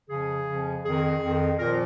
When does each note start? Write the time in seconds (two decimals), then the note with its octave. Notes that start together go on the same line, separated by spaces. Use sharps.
0.09 F2 C#3 F3 G#4
0.47 F2 C#3 F3
0.84 F2 D#3 G#4
1.21 F2 D#3
1.58 A#2 F3 A#4